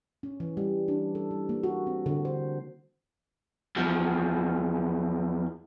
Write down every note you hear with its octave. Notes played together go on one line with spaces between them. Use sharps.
C#4
E3
G3
D4
A4
G3
A#3
F#4
C4
D3
C5
E2 F3